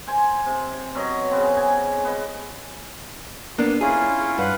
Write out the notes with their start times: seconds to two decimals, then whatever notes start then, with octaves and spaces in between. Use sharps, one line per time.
0.07 C5 G#5
0.46 C3
0.95 B2 F#3 C#5 D#5
1.31 C#3 B3 C4
1.57 G#5
2.05 B3 D#5
3.58 A#3 B3 D4
3.81 C#4 E4 F4 G#4
4.38 G2 F4 B4 F#5